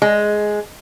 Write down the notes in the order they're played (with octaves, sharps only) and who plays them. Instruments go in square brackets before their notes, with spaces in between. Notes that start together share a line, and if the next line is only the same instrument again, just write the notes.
[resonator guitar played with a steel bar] G#3